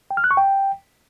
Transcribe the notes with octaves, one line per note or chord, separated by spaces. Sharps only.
G5
F6
F#6
C#6
G5